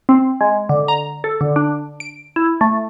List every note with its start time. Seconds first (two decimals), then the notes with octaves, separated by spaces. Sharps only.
0.09 C4
0.41 G#3
0.69 D3
0.88 A#5
1.24 A4
1.41 D3
1.56 D4
2.00 D7
2.36 E4
2.61 A3